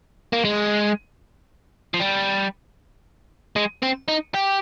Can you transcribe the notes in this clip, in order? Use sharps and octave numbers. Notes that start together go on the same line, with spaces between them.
A#3
G#3
F3
G3
G#3
C4
D#4
G4